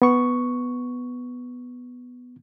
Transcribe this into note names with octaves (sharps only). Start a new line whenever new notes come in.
B3 C#6